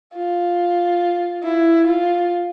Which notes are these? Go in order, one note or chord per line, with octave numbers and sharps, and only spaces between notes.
F4
E4
F4